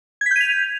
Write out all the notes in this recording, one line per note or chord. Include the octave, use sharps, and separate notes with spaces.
G6 G#6 B6 D#7 F7